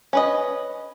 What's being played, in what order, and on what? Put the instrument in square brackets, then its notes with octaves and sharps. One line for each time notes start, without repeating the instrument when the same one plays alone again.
[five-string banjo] C#4 B4 D#5